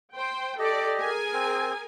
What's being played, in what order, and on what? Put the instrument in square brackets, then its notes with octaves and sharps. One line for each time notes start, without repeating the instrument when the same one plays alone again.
[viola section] C5 G5
[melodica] G4 D#5 [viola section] A4 D5
[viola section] G#4 A#4 G#5
[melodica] C4